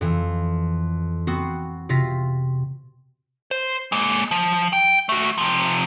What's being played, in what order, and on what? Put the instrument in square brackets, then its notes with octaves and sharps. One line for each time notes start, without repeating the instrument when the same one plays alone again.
[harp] F2 E3
B3 C4 F#4
C3 F4 A#6 B6
[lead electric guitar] C5
G#3 A#3
F3
G5
A3 F#4
C3 F3